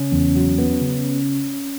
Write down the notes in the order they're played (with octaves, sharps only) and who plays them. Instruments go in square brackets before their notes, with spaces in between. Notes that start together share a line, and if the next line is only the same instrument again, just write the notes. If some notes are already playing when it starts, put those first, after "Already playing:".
Already playing: [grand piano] C#3 [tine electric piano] C#4
[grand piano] E2
F#3
B3
C#3